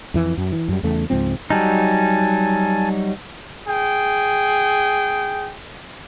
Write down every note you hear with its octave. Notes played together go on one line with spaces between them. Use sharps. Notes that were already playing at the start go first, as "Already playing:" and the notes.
F2 E3
F#2
E3
F#2 G3
E2 C#3 A3
C#2 G#2 F3 C4
F#3 G3 D#4 G#5 A5
G#4 G5